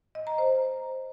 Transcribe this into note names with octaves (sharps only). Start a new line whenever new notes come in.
D#5
A#5
C5